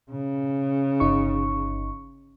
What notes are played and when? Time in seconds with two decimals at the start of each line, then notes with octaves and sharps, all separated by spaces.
0.11 C#3
1.00 G1 D#4 C#6